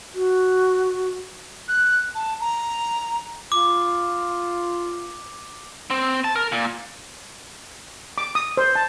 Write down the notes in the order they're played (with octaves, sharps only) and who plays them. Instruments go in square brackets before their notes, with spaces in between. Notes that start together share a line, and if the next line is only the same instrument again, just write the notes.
[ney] F#4
[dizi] F#6
A5
A#5
[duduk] F4 [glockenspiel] D6
[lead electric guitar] C4
A5
A#4
A#2
[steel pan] D6
D#6
C5
A5